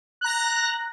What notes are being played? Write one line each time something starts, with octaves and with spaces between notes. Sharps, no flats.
A#5 F#6 A#6